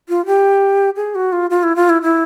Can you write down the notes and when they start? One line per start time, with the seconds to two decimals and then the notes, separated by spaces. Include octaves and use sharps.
0.09 F4
0.26 G4
0.96 G#4
1.15 F#4
1.32 F4
1.50 F4
1.63 E4
1.76 F4
1.90 E4
2.02 E4